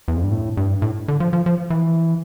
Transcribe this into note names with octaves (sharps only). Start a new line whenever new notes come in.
E2
F2
G2
A2
G2
A2
D3
F3
F3
F3
E3